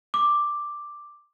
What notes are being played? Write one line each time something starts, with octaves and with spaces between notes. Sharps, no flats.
D6